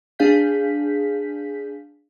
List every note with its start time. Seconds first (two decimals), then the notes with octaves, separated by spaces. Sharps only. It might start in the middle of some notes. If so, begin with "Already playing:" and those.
0.19 D4 G#4 F5 G6 B6